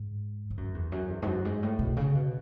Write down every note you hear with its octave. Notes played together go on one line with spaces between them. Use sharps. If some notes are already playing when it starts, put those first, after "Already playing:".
Already playing: G#2
G#2
F#2
E2
F#2
E2
G#2
F#2
G#2
A2
B2
C#3
B2